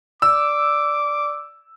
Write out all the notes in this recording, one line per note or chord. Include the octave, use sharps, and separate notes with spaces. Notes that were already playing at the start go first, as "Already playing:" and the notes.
D5 D6 E6